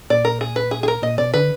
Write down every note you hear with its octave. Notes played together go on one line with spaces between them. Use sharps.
A#2 D5
A#4
G#4
B4
G#4
G#4
A#4
A#2 D#5
B2 D5
D3 B4